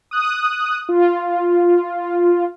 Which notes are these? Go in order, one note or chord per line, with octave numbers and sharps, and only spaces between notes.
D#6 F#6
F4